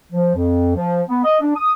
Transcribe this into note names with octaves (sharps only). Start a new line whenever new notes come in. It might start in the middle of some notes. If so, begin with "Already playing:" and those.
F3
F2
F3
B3
D#5
D4
D#6